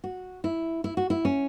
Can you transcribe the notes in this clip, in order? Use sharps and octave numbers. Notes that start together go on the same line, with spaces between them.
F#4
E4
E4
F#4
E4
C#4